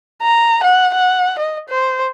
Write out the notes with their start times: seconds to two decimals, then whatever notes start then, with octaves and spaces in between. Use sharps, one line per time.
0.22 A#5
0.64 F#5
0.94 F#5
1.39 D#5
1.69 C5